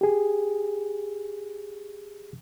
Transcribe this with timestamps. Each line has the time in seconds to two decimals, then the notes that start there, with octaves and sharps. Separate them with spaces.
0.01 G4 G#4